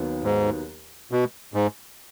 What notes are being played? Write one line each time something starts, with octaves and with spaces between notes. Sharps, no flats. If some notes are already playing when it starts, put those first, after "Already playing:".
Already playing: D#2 D#3 F#3 B3
G#2
B2
G#2